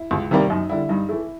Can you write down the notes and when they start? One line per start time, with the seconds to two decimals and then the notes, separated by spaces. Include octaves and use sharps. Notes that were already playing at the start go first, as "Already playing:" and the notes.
Already playing: E4
0.11 C#2
0.31 C3 D#3 G3 A#3
0.50 F#2 D#4
0.69 D3 G3 E4
0.89 G2 D#4
1.09 E3 A3 E4